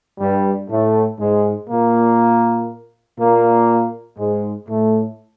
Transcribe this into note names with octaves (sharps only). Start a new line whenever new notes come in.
G2 G3
A2 A3
G#2 G#3
A#2 A#3
A#2 A#3
G#2 G#3
A2 A3